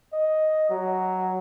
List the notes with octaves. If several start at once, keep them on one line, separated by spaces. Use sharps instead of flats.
D#5
F#3